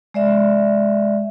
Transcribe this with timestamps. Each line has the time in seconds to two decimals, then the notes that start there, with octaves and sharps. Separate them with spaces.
0.14 G#3 D5 E5